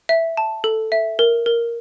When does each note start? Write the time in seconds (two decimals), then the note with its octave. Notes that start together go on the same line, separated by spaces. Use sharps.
0.09 E5
0.37 A5
0.64 A4
0.92 E5
1.19 A#4
1.46 A#4